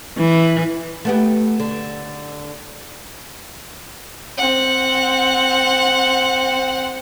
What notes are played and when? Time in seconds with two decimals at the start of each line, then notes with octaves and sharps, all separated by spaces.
0.17 E3
1.05 A3 B3 G4
1.60 D3
4.38 C4 F#5